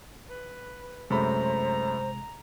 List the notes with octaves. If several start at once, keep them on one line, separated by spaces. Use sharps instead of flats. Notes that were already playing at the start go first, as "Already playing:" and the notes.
B4
F#2 C3 G#3 A3 C5 A#5 B5